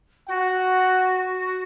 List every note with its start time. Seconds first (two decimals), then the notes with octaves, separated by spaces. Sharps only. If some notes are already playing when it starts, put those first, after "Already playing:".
0.28 F#4 F#5